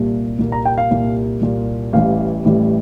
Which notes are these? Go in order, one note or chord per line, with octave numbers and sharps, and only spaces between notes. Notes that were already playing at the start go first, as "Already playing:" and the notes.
Already playing: C2 A#2 G3 A#3
C2 A#2 G3 A#3
A#5
G5
F5
C2 A#2 G3 A#3
C2 A#2 G3 A#3
A1 A2 E3 G3 F5
A1 A2 E3 G3